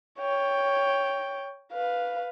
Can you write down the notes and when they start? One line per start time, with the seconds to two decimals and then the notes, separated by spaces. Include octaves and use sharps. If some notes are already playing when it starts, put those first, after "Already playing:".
0.19 C#5 G5
1.72 B4 F5